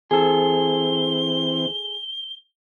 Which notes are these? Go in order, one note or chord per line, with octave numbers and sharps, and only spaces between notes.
E3 C4 G#4 A4 G7